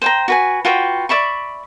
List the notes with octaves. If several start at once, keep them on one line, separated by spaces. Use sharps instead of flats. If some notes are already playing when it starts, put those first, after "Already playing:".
C5 G5 A#5
F#4 B4 G#5
F4 F#4 B4 G5
D5 E5 B5 C#6